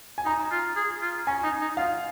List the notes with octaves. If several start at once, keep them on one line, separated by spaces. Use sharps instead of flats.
G#5
D#4 A#5
F4
G#4
F4
C#4 G#5
D#4
D#4
F4 F5